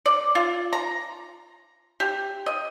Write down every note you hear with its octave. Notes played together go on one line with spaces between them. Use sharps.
D5
F4
A#5
G4
D#5